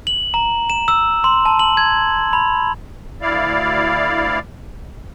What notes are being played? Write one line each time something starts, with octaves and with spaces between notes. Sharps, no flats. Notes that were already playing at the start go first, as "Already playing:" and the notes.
F#7
A#5
E7
E6
C6
A5
F#7
G#6
B5
D2 E4 D5 F5